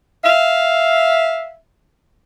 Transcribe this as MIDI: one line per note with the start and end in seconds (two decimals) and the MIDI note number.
0.24 1.54 76
0.24 1.54 77